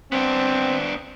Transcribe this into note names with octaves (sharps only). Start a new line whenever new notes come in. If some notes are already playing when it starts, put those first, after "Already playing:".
B3 C4 D4